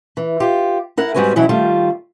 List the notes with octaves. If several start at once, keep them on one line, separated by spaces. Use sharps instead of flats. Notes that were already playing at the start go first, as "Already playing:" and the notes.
E3
F4 G4
E4 A#4 F#5
G#2 G3 C4 F#4 B4 G#5
B2 E3 F#3 C#4 E4
D#3 G3 A3 F4